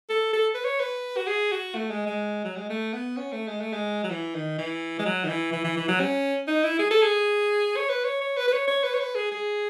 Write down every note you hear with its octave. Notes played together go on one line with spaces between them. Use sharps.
A4
A4
B4
C#5
B4
F#4
G#4
F#4
A3
G#3
G#3
F#3
G#3
A3
B3
C#4
A3
G#3
A3
G#3
F#3
E3
D#3
E3
G#3
F#3
D#3
E3
E3
E3
E3
F#3
C#4
D#4
E4
G#4
A4
G#4
C#5
B4
C#5
C#5
B4
B4
C#5
C#5
B4
C#5
B4
G#4
G#4